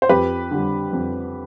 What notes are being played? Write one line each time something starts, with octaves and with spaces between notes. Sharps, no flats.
C5
F2 G4 B4
D3 G3
F2